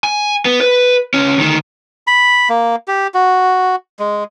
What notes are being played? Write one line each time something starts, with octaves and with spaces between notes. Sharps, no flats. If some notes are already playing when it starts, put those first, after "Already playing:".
G#5
B3
B4
C#2 C#4
D2 D#3
B5
A#3
G4
F#4
G#3